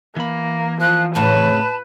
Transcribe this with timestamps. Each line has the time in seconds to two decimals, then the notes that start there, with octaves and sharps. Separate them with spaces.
0.16 E3 A#3 B5
0.81 F3 F#6
1.15 F2 A2 C#3 B4 A5